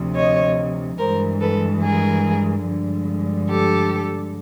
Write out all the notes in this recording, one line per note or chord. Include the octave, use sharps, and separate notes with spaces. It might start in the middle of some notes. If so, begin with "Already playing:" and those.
Already playing: D2 C3 F3
C#5 D#5
G2 E3 G#3 A#4 C5
A4 B4
G#4 A#4
G2 D3 F3 G#3
G4 A4